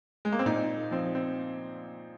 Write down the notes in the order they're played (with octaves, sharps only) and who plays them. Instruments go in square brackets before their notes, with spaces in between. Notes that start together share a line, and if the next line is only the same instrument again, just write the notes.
[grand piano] G#3
A#3
C4
A#2 D#4
F3 C4
C4